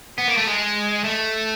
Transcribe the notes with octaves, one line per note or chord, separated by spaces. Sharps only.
B3
A#3
A3
G#3
A3